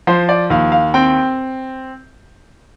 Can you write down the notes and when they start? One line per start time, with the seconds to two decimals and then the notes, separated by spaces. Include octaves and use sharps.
0.07 F3 C5
0.29 D5
0.50 D#2 F5
0.72 F5
0.94 C4 G5